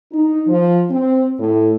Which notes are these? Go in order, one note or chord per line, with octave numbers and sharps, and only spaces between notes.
D#4
F3
C4
A2